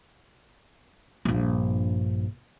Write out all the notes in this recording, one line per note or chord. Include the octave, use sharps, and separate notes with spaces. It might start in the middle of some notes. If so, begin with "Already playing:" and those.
A#1 G2